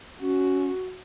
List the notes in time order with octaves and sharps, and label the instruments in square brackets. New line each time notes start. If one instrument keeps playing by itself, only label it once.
[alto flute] C#4 [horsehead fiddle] F#4